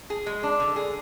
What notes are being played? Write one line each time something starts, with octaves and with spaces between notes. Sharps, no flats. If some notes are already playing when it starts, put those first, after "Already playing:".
G#4
G#3
D4
D3
G#4